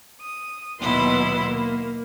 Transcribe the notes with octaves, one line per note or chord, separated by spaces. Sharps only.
D#6
D#2 B2 F#3 B3 E4 C6
A#3